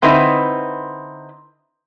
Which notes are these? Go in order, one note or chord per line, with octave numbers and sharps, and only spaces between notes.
D3 C4 D#4 E4 B4